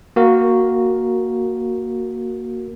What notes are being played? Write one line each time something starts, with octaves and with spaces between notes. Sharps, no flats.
A#3 F#4 A#4